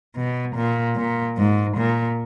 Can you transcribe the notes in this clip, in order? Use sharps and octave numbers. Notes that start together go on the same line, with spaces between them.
B2
A#2
A#2
G#2
A#2